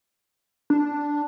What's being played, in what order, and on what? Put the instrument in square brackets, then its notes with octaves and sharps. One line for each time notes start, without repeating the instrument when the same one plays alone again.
[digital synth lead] D4